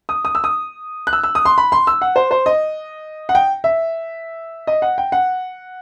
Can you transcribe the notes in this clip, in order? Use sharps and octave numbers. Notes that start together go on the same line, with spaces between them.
D#6
D#6
E6
D#6
F#6
E6
E6
D#6
C6
B5
C6
E6
F#5
C5
C5
D#5
F#5
G5
E5
D#5
F#5
G5
F#5